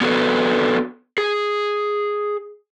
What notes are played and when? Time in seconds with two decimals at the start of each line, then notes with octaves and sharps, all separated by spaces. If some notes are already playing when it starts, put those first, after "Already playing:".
0.01 B3 D4 F#4 A4 B4
1.18 G#4